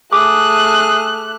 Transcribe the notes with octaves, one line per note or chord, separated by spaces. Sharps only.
A3 G#4 D6 F#6